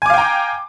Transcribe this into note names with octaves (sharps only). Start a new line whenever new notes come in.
F5 G5 G#5 A#5 D6